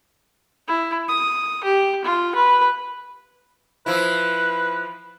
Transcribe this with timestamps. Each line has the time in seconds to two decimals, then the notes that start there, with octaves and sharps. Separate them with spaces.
0.68 E4
1.09 D#6
1.64 G4
2.04 F4
2.35 B4
3.86 F3 E4 B4